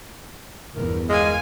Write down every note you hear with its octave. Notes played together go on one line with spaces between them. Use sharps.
G1 E2 A#4
G#3 F5 G#5